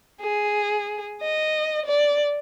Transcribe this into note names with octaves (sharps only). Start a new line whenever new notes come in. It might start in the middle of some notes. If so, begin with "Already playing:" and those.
G#4
D#5
D5